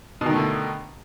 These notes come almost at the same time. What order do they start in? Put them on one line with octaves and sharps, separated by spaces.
B2 D#3 A3 D3